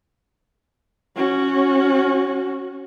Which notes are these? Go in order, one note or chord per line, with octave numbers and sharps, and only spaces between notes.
C#4 F#4